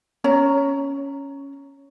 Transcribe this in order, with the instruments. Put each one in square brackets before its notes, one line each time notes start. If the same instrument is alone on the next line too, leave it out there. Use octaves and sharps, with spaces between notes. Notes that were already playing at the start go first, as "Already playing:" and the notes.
[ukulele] C#4 C#5 A#5